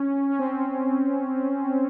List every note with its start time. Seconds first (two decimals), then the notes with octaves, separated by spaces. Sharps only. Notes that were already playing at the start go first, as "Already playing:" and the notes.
Already playing: C#4
0.29 C#4
0.39 C4